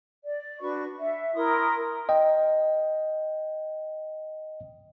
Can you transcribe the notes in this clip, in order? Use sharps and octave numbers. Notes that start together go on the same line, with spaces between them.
D5
D4 F#4 B4 C#6
E5 F#5
E4 A#4 C6 D#6
D#5 G5